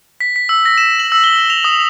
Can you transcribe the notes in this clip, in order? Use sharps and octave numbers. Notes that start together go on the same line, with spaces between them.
B6
B6
E6
A#6
E7
F#7
E6
G7
G7
F7
D#6